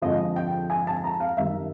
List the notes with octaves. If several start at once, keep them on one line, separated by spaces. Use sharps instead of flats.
F2 D3 F3 G#3 D#5
G5
G#5
A5
A#5
F5
F#2 D#3 G3 E5